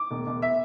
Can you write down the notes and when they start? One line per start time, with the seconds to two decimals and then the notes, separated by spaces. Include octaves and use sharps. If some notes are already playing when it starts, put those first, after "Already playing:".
Already playing: D6
0.11 E1
0.27 E1
0.42 E5